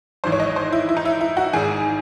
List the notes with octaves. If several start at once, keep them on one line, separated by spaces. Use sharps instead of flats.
G#1 G#2 E3 C5
C#5
D#5
C#5
C5
E4
E4
D#4
E4
E4
F#4
G#1 G#2 D#3 G#4